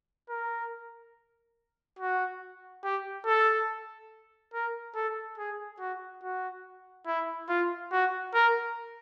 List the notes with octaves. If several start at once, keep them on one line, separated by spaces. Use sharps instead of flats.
A#4
F#4
G4
A4
A#4
A4
G#4
F#4
F#4
E4
F4
F#4
A#4